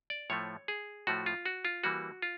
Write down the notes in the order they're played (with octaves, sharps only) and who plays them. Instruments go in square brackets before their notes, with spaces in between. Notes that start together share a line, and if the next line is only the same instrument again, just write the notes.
[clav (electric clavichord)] D5
A2 F3 A3 C#5
G#4
A2 F3 A3 F#4
F4
F#4
F4
E3 G3 A#3 F#4
F4